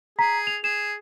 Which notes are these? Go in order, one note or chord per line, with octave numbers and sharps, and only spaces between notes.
G#4 A#5 B6
F7
G#4 E7